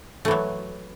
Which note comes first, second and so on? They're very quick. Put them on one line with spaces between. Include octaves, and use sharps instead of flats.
A3 E3 F#3